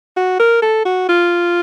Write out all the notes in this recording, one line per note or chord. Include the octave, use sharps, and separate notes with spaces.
F#4
A#4
A4
F#4
F4